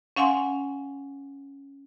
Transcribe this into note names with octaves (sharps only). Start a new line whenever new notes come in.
C#4 F5 F#5 G#5 C6